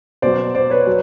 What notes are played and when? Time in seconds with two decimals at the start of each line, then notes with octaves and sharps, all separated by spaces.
0.22 B2 F#3 C5 D5
0.55 C5 D5
0.70 B4 C#5
0.87 F#3